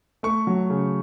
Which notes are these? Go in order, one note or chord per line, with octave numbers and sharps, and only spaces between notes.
A3 C#6
F#3
C#3